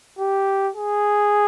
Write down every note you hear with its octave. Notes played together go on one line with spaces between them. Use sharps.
G4
G#4